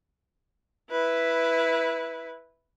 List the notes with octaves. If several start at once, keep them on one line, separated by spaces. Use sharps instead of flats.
E4 B4